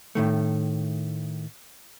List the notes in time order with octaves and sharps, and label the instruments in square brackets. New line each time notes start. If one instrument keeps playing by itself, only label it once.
[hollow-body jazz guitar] A2 D#3 A3